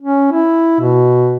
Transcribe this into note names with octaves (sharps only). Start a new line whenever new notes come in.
C#4
E4
B2